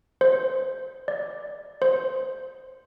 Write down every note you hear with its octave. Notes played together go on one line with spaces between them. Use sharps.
C5
D5
C5